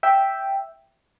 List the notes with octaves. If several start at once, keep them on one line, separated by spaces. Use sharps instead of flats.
E5 G5